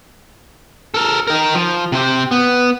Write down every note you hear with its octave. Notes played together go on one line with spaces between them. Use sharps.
A4 A#4
D#4 A#4
F3
C3 C5
B3